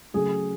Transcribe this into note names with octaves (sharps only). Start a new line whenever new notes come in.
C#3 F#3 A3 G#4